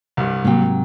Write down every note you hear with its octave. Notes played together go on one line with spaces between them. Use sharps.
C2 G2
G#2 C3 F#3 A#3 G5